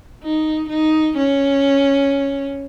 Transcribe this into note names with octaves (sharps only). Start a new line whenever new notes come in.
D#4
D#4
C#4